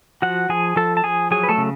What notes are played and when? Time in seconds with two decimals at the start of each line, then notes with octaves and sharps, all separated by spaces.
0.22 F3 F#4 F#5
0.49 F3 G#4 G#5
0.76 F3 A4 A5
0.97 A5
1.04 F3 G#4 G#5
1.31 F#3 G#4 G#5
1.44 B4
1.49 A3 A4
1.58 C#3